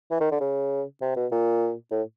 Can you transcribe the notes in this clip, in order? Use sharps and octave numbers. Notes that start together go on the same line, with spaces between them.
E3
D#3
D3
C#3
C3
B2
A#2
A2